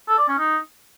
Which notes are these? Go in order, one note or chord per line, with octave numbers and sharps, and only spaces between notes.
A4
D5
C#4
D#4